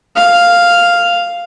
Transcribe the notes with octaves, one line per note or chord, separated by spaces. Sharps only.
F5